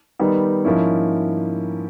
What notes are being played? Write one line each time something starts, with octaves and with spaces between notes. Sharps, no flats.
D#3 G3 B3 D#4
G#2 F3 A#3 C#4 E4